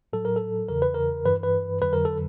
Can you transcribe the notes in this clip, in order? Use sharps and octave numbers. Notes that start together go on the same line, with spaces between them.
A2 F#3 A4
A#4
A4
E2 C#3 E3 A#4
B4
A#4
G2 E3 B4
B4
F2 D3 F#3 B4
A#4
A4